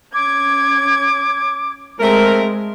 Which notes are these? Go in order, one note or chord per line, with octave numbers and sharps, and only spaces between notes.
C#4 D6 G#6
G#3 A3 C4 A#4